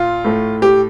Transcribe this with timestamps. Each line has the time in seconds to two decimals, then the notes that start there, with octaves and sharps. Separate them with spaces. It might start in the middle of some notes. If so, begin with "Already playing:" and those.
Already playing: A#2 F4
0.24 A2 A3
0.62 G4